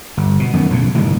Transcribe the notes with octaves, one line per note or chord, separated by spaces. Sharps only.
G1
B2
F#2 D#3 E3 B3
B1 A2 C#3
G1 A2 C3 D#3